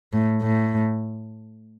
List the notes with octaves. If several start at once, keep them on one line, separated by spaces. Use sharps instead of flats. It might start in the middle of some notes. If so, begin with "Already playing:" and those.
A2
A2